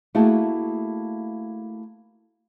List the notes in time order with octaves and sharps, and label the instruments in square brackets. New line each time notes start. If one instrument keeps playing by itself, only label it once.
[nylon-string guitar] A3 A#3 E4 F#4 G#4 A5